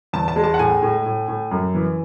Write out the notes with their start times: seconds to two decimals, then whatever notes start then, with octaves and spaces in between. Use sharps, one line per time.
0.13 E2 A5
0.28 A5
0.36 G#3
0.44 A5
0.54 F#5
0.59 A2 G#5
0.82 A2
1.06 A2
1.28 A2
1.51 F#2
1.75 E3